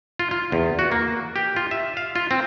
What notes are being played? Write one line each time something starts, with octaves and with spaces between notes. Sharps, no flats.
F4
F4
E2
F#4
A#3
G4
F4
E5
F5
F4
C4